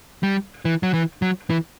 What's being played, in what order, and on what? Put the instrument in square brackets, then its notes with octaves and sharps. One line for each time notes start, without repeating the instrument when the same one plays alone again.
[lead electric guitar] G3
E3
F#3
E3
F#3
E3